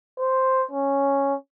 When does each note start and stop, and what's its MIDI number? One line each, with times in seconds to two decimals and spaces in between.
0.20 0.65 72
0.71 1.35 61